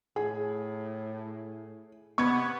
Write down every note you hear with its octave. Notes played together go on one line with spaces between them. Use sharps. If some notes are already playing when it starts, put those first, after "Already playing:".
A2 G#4
C3 B3 C#6 G#6